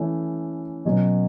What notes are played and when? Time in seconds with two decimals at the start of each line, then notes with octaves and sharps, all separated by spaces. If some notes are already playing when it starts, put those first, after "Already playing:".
Already playing: E3 A3 C#4
0.85 B2 F#3 C#4